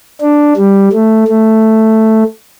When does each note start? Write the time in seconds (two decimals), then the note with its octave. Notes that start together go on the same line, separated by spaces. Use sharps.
0.21 D4
0.57 G3
0.93 A3
1.28 A3